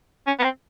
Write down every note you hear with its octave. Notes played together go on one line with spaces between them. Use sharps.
C#4
B3
C4